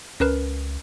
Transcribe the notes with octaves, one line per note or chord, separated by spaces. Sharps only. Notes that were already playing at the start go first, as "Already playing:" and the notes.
C#2 C#4 A#4 B4